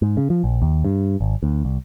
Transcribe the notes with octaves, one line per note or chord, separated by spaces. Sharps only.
G#2
C#3
F3
A#1
D#2
G2
G#1
D2
C2